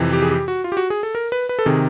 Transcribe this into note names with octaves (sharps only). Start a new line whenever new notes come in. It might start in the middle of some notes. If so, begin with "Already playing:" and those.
Already playing: F2 C3 E3
G4
G#4
G4
F#4
F4
G4
F#4
G#4
A4
A#4
B4
B4
A4
C3 D#3 G#4